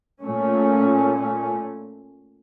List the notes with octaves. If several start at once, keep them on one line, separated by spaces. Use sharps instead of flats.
A#2 A3 C#4